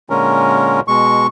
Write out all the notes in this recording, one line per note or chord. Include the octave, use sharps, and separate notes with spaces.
A#2 D3 G#3 C#4 A#4
B2 G#3 C#6